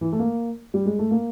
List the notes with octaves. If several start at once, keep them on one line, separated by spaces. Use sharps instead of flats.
E3
A3
A#3
G3
G#3
A3
A#3